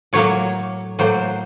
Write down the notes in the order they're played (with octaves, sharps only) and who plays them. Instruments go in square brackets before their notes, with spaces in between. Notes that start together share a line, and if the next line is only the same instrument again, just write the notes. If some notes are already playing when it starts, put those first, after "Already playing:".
[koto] A2 F#3 A#3 C#5
A2 F#3 A#3 C5